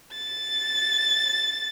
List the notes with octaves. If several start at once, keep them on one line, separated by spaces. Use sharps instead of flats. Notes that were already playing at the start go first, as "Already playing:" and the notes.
A6